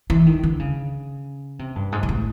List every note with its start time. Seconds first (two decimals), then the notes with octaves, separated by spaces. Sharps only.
0.10 E3
0.26 D#3
0.43 D3
0.59 C#3
1.59 C3
1.76 G2
1.92 G#2
2.03 A#2
2.09 A2